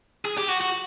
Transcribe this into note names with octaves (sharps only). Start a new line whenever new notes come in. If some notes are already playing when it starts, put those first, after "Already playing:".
G#4
G4
F#4
F#4